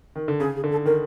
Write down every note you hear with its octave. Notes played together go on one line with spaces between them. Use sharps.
D#3
D3
C#3 G#4
G#4
D3
A4
D#3 A#4